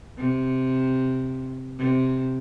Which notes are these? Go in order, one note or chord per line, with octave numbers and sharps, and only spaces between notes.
C3
C3